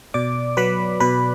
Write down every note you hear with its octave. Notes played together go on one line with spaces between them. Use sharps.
B2 D5 D6
F#3 B4 B5
B2 B4 B5